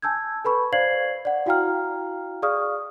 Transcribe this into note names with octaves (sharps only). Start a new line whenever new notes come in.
G#5 A5 E6 G6 G#6
A4 B4 B5 C#6
C5 D5 F5 G#6 C7 F#7
D5 F#5
E4 F#4 F5 G5 A#5 F6
G#4 D5 F5 C#6 D#6 F6